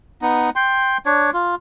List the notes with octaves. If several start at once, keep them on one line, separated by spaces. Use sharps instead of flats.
B3 D#4
G5 C6
D4 C#5
F4